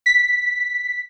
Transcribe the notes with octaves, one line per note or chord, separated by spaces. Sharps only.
B6